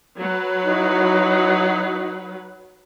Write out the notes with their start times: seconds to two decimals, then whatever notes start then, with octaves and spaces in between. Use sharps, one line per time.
0.18 F#3 B4
0.63 D#4 E4 F#4